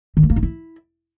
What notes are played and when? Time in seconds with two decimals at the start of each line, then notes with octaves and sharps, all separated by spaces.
0.17 D#3
0.23 A3
0.30 A#3
0.36 D#4
0.43 E4